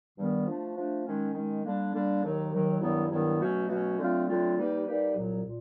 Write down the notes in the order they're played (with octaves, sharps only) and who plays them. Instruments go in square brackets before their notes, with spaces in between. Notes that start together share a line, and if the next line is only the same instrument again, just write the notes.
[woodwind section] G2 D#3 G3 B3
F3 A3 D4
F3 A3 D4
D#3 G#3 C#4
D#3 G#3 C#4
D3 G3 A#3 D4
D3 G3 A#3 D4
D#2 D#3 F#3
D#2 D#3 F#3
G2 D#3 F#3 B3 E4
G2 D#3 F#3 B3 E4
B2 F#3 A3 C#4 F#4
B2 F#3 A3 C#4 F#4
D3 F#3 A3 C4 F4
D3 F#3 A3 C4 F4
G3 A#3 D#4 G4 B4
G3 A#3 D#4 G4 B4
C2 A#2 F#3
A#2